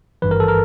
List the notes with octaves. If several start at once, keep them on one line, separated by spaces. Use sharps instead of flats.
G#1 G2 E3 B4
A#4
A4
A#4